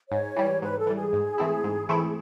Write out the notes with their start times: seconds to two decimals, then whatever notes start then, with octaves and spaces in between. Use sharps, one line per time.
0.10 G#2 C#5
0.36 E3 G3
0.62 G#2 B4
0.79 A4
0.87 E3 G3
0.96 G#4
1.13 G#2
1.38 E3 A3 C4 E4
1.64 G#2
1.89 E3 A3 C4 E4